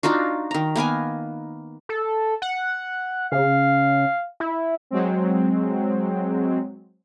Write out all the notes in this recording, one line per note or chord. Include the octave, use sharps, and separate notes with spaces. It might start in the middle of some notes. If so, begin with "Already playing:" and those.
D4 D#4 F4 F#4
D#3 A#5
A#3 B3 A#4 G#5
A4
F#5
C#3 F5
E4
F#3 G#3 C4